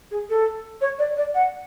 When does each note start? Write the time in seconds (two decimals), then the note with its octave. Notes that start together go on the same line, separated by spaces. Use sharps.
0.11 G#4
0.30 A4
0.81 C#5
0.99 D5
1.17 D5
1.35 F#5